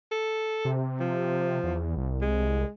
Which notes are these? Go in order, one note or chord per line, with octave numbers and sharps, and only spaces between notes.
A4
C3
F3
E2
C2
G#3